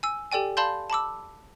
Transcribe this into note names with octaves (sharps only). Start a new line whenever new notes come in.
G#5 E6
G4 A4 D5 G5 G#5
D5 F5 A5 B5 C6 G6
A5 B5 D6 E6